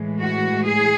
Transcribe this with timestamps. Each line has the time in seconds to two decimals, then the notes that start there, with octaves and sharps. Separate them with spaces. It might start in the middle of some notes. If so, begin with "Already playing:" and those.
Already playing: A2 E3 G#3
0.20 F#4
0.65 G#4